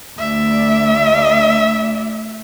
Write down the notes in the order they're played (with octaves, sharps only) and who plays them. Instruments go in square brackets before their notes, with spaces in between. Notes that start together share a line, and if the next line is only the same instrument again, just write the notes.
[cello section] D2 D5 [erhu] E5